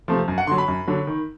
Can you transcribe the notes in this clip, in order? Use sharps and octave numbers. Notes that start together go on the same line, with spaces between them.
C3 F3 A3
F#2
F#5
D3 F#3 C6
B5
F#2
D3 F#3
D#3